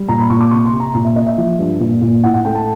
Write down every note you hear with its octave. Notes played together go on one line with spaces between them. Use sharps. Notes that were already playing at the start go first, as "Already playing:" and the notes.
Already playing: G3
A#2 A#5
B5
A#2 C#6
D6
C3 C#6
C6
C3
A#5
A#2 A#5
E5
A#3 D#5
E5
F3
G2
A#2
A#2
A2 F#5
F#5
A3 G5
A5